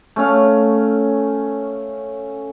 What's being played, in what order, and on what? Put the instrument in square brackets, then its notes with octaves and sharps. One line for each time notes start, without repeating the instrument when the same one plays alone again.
[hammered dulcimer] A3 C#4 F5